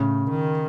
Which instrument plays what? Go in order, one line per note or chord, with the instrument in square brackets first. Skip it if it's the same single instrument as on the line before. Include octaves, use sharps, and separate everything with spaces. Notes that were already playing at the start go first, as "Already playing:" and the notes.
Already playing: [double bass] A2 [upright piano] C#3
[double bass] D#3